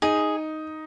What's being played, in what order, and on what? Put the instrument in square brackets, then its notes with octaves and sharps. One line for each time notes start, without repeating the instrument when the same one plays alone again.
[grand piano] D#4 [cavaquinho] G#4